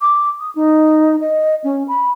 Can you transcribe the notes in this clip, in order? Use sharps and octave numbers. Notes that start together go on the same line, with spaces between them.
D6
D#6
D#4
D#5
C#4
B5